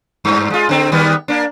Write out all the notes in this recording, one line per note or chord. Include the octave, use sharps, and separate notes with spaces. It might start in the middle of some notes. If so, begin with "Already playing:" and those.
G2
G#3 F4
D3 C4
D#3 G3 B3
A#3 D4